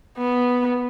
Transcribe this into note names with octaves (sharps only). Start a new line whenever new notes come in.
B3